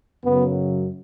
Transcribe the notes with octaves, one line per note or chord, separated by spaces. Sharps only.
F#2 C#3 F#3 B3